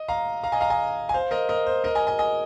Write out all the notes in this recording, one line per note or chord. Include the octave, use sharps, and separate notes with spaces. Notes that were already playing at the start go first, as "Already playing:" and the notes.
Already playing: D#5
F5 A#5
F5 A#5
D#5 G#5
F5 A#5
D#5 G#5
G#5
C5 F5
A#4 D#5
A#4 D#5
C5
A#4 D#5
D#5 G#5
D#5 G#5
D#5 G#5